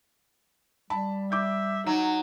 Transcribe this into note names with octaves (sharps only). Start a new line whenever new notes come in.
G3 A5 B5
E5 D6 G6
F#3 D#4